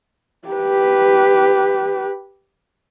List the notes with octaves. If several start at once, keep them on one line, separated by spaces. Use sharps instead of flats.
G4 B4